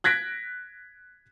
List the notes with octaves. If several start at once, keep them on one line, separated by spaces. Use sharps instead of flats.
F#6 G#6 A#6 B6 D7